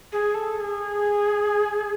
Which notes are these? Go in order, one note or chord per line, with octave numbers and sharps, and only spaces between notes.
G#4
A4
A4
G#4